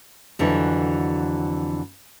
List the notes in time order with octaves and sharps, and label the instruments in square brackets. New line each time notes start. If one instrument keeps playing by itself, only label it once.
[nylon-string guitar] F2 D3 E3 F#3